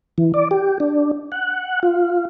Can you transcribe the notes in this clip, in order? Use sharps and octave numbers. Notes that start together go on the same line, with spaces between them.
E3
D5
G4
D4
F#5
F4